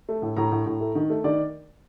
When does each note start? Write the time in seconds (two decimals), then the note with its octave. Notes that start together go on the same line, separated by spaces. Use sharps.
0.09 A3
0.22 A2
0.37 A2 A#5
0.52 A2
0.66 A2
0.81 A3
0.95 D#3
1.10 A3
1.24 D#3 D5